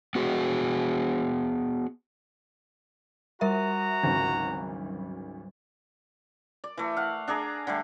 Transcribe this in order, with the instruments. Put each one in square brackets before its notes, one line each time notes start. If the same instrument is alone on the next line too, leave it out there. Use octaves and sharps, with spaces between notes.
[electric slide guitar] B3 F#4 G#4
[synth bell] G3 A#4 E5 [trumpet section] F#4 A#5
[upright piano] G#1 D2 C#3 [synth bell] F#3 G3
[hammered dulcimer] D5
E3 A3
F5 F#5
D4 G#4 D5 A#5
D3 G3 A3